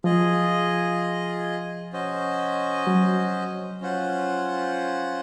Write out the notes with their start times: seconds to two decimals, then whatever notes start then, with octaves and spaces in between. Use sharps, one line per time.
0.04 F3 F4 G#4 D#5
1.93 C#4 F#4 C5 D#5
2.87 F#3
3.81 C#4 F4 C5 F#5